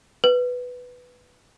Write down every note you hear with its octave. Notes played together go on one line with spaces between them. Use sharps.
B4